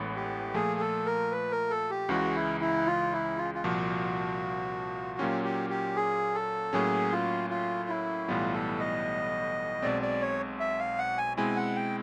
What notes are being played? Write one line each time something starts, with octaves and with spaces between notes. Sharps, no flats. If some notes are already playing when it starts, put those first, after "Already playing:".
Already playing: A1 A2 E3 G#3 B3
G4
A#2 F3 A3 G#4
A4
A#4
B4
A#4
A4
G4
C#2 C#3 E3 G#3 F#4
E4
E4
F4
E4
F4
F4
C2 A#2 F3 F#4
A#2 F#3 A#3 C#4 F4 G4
G4
G4
G#4
A4
A2 F#3 A#3 C#4 G#4
F4
F4
E4
B1 A2 E3 G3 B3 F4
A4
D#5
B1 B2 G#3 C4 D5
D5
C#5
E5
F5
F#5
G#5
B2 G#3 C4 E4 G#5
F#5
G5